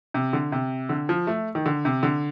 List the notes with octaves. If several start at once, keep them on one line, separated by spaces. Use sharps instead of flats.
C3
D3
C3
D3
F3
A3
D#3
D3
C3
D3